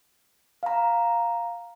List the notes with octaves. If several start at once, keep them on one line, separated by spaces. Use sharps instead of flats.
F5 A#5